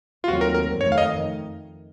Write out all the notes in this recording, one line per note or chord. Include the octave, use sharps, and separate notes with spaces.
F4
D#2 D#3 F#3 A3 C4 F#4
A#4
A#4
F2 D#3 A3 C#5
F5
D#5